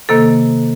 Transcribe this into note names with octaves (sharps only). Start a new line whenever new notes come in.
C3 D#3 A#3 A4